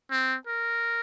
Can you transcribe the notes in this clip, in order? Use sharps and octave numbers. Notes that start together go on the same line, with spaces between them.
C4
A#4